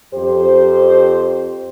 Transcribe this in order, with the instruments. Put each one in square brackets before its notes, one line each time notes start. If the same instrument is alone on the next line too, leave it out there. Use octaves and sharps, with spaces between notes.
[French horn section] F2 G4 C5